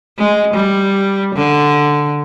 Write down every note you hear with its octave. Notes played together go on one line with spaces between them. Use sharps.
G#3
G3
D3